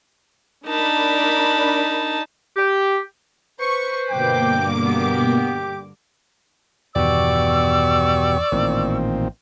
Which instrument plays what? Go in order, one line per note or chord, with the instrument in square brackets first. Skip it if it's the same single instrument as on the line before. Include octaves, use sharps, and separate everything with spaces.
[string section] D4 A#4 B5 [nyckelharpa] D#4 A5
[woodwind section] G4
[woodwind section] B4 C5 [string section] C#6
[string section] G2 D3 D6 [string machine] B2 A#3 [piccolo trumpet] G5
[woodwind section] B3 [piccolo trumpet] G4
[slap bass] E2 G2 D#3 [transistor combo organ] B2 G4 [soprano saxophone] D5 [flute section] C#6 E6
[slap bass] A1 [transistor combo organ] A#2 D#3 C4